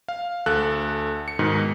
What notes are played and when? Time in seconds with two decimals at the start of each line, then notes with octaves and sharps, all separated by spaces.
0.08 F5
0.46 D2 A4 F#6
1.28 C#7
1.39 G#2 B2 D#3